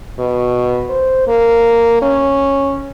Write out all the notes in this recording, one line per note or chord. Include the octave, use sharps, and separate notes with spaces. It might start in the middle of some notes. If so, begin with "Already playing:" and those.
B2
C5
A#3
C#4